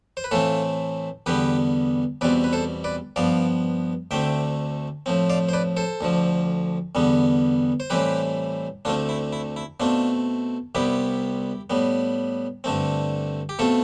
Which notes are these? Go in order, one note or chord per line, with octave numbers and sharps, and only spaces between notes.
C5
B4
A2 E3 A3 C4 F4 A4
E2 D3 G3 B3 G4 B4
E2 B2 G3 C4 B4 D5
B4
A4 C5
B4 D5
G2 F3 B3 D5 F5
D2 D3 A3 C4 E5 G5
A2 F3 C4
D5 F5
C5
B4 D5
A4 C5
D2 D3 F3
E2 D3 G3 B3
C5
A2 E3 G3 C4 G4 B4
D2 D3 A3 C4 D4 F4
E4
E4
E4
B2 A3 C4 D4 F4
C2 C3 G3 B3 E4 G4
A2 G3 B3
G2 D3 A3 C4
G4
B2 A3 C4 F4 A4